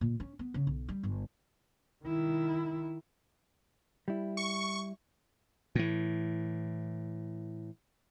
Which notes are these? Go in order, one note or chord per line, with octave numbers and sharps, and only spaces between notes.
A#2
C#4
B3
C#3
B1
G3
G1
D#3 E4
G3 E4
C#6
A2 E3